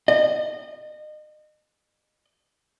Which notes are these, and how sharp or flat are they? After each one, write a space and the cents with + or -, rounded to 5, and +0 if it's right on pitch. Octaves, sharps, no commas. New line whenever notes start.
D#5 -30